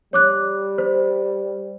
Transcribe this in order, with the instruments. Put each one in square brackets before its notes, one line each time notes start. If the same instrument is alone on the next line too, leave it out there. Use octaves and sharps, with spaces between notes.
[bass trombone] G3 [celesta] C#5 D6 F#6
[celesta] C5